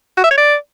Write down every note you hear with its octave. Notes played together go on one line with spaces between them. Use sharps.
F#4
E5
C#5
D5